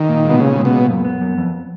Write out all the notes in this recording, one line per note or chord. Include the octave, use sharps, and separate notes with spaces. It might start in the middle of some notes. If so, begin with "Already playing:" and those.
Already playing: D#3
A#2
G#3
B2
A#2 C#3
G#3
B2
A#2
F#2
B3
F#2
F2